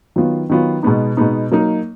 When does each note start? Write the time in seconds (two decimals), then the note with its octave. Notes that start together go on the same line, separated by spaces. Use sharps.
0.16 D#3 F#3 B3 F4
0.50 D#3 F#3 B3 F4
0.83 B2 G#3 B3 D#4
1.17 B2 G#3 B3 D#4
1.51 F#3 A#3 D#4